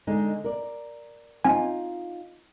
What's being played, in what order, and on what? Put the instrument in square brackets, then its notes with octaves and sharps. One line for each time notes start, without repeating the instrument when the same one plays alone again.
[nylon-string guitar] D3 G#3 D#4
A#4 D5
[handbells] C4 G#5 [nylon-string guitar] D#4 F4